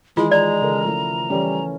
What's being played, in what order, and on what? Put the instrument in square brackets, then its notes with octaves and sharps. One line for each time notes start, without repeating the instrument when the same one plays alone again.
[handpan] D#3 E3 [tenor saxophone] G#3 [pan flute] E4 [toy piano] F4
[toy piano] D5 [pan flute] A#5
[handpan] C#3 A4 A#4
F3 A3 E4
[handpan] E3 C#4 [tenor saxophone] G3